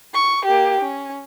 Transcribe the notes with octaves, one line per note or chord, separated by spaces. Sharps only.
C#6
A#3 G4
C#4